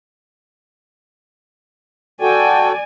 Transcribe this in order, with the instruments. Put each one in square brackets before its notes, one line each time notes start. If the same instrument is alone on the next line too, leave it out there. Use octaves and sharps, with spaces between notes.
[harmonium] F#4 A4 G5 [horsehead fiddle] D5 G#5